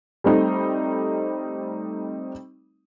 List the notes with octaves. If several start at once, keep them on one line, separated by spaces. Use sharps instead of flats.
G3 A3 C4 D#4